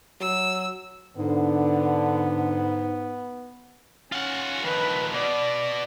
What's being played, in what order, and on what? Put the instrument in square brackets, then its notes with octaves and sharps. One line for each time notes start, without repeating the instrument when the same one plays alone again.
[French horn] F#3 [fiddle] E6
[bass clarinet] G#2 [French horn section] D3 [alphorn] B3
[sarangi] C#4 [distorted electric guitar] F4 F#5
[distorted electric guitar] D#3 F3 [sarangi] B4
[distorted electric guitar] B2 [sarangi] D5